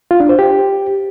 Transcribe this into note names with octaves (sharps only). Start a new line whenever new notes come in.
F4
D4
C5
G4